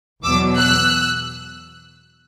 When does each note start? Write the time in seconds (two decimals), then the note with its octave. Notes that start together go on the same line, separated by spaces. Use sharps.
0.24 E2 B2 F#3 D6 E6
0.57 E6 F#6